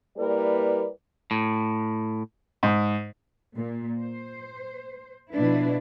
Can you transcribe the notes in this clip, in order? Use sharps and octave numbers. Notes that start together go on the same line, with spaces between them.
G3 A#3 E4 A#4 B4 D5
A2
G#2
A#2
C5
B2 F3 D4 E4 B4